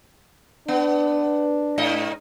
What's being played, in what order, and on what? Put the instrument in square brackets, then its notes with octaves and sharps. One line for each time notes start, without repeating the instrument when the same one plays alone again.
[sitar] B3 [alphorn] D4
[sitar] G#2 D#5